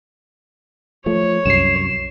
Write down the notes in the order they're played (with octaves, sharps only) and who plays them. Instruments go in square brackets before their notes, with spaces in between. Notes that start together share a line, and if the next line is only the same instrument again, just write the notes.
[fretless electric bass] F3 A3 [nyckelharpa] C#5
[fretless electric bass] C2 F#2 [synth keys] C7 E7